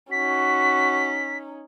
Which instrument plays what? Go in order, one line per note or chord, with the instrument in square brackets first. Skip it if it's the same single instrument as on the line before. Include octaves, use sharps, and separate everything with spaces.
[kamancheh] C#4 D#4 [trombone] F#4 [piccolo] B6